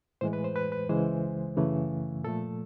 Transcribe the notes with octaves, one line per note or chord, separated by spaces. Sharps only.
A2 E3 G#3 C5
B4
C5
B4
B4
C#2 C#3 E3 G#3 C5
F#2 C#3 E3 A3
A#2 F3 A3 A4